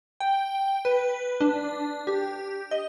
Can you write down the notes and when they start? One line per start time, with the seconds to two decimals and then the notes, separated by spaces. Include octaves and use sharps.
0.20 G5
0.85 B4
1.41 D4
2.07 G4
2.71 D#5